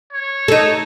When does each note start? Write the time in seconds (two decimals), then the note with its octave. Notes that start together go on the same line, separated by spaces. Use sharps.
0.13 C#5
0.48 D#4 A4